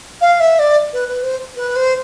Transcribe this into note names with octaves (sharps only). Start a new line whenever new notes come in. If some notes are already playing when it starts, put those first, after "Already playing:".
F5
E5
D5
B4
B4
C5
B4
C5